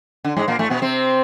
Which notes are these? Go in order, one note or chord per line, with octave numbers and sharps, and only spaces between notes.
D3
G#2 G#3
A#2 A#3
A2 A3
B2 B3
C3 C4